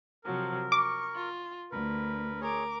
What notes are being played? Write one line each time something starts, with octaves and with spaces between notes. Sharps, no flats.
C3 F3 F#3 A#4
C#6 D6
F4
D2 A#4 B4
G#4 A#4 C#5 D6